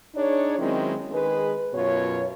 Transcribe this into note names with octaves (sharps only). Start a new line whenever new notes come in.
D4 D#4 G#4 C#5
D#3 F#3 G#3 C4 C#4 E4
D#3 G#3 G#4 B4
F#2 B2 F4 C#5